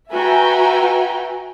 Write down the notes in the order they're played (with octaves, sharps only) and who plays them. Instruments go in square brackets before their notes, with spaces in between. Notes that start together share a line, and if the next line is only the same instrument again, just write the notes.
[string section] F#4 B4 E5 G5 G#5 A#5